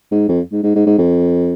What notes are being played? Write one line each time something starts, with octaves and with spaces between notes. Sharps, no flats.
G#2
F2
G#2
G#2
G#2
G#2
F2